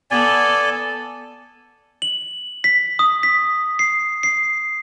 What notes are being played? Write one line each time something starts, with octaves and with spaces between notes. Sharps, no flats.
B3 A4 D5 G#5
F#7
B6
D#6
B6
C7
C7